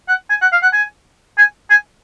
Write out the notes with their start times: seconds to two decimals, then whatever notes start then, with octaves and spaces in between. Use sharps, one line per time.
0.09 F#5
0.30 G#5
0.42 F#5
0.53 F5
0.63 F#5
0.73 G#5
1.38 G#5
1.70 G#5